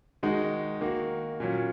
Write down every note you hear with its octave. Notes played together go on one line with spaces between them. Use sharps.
D#3 G#3 D#4 F#4
D#3 A#3 F#4
A#2 F#3 C#4